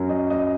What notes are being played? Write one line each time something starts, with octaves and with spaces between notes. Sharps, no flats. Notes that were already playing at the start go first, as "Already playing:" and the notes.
Already playing: F#2 F#3
D#5
D#5